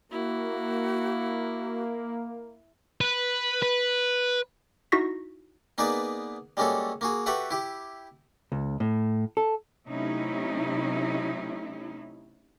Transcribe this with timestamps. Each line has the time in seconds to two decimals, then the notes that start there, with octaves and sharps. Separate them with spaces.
0.11 A#3 E4 F#4
3.01 B4
3.63 B4
4.92 D#4 E4 F#4 C#6 A#6 B6
5.78 A#3 B3 D#4 G#4 B4 D5
6.57 G3 G#3 A#3 C#4 F#4 A4
7.01 A#3 F#4 G#4
7.26 F#4 G4 A4 B4 E5 F#5
7.51 E4 G4
8.52 C#2
8.80 A2
9.37 A4
9.86 C3 F#3 A3 C#4 D#4 E4